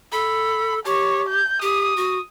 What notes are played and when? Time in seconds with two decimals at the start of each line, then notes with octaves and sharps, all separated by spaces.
0.12 A4 B5
0.85 G4 C#5
1.29 G6
1.62 G4 D#6
1.97 F#4